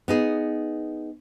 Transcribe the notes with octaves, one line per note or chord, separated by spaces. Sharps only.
B3 D#4 G#4